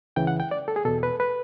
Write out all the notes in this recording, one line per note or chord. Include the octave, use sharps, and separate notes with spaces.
C#2 C#3 E3 G5
F#5
G5
D5
A4
G#4
E2 B2 A4
B4
B4